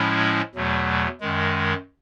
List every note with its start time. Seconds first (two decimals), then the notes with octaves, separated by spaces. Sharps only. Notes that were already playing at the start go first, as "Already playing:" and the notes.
Already playing: A2 F3 G#3 C#4 E4
0.54 E2 B2 F#3 A3
1.21 F#2 D#3 G#3